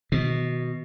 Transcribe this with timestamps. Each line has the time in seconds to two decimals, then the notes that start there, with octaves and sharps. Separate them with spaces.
0.12 B2 D#3